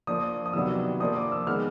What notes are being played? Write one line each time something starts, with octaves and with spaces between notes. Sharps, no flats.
F3 A#3 D4 D#6
D#6
C3 D#3 F#3 B3 D4 E6
F3 A#3 D4 D#6
D6
E6
D#3 G#3 B3 F6